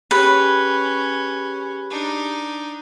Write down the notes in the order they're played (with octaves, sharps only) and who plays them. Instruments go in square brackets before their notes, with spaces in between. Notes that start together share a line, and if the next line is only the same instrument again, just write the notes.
[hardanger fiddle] C#4 [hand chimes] G4 G#4 B5 [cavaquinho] B4
[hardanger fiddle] D4 D#4